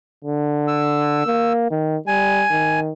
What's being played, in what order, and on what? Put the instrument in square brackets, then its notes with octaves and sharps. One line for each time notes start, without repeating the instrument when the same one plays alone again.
[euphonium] D3
[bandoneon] E6
[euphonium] A#3
D#3
[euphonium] G3 [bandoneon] G#5
[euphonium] D#3